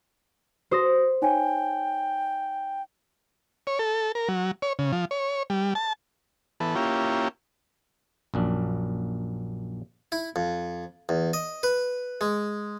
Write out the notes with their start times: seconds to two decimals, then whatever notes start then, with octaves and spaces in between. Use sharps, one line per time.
0.71 F#4 C5 D#6 A#6
1.22 D#4 C#5 G5 G#5
3.67 C#5
3.79 A4
4.15 A#4
4.29 F#3
4.62 C#5
4.79 C#3
4.92 F3
5.11 C#5
5.50 G3
5.75 A5
6.60 E3 B3 A4
6.75 A#3 C#4 E4 F4 G4
8.34 A#1 F#2 D4
10.12 E4
10.36 F2
11.09 E2
11.33 D#5
11.63 B4
12.21 G#3